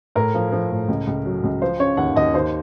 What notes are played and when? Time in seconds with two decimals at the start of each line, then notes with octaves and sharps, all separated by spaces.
0.16 A2 A#4
0.34 F3
0.52 F3
0.71 A2
0.88 C#2
1.07 C#2
1.25 F#3
1.44 C#2
1.62 F3 C5
1.79 C#3 C#5
1.97 D#2 F#5
2.16 D#2 D#5
2.34 D#2 C5